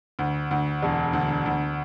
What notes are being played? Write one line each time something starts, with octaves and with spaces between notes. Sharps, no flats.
D2
D2
E1
D2
D2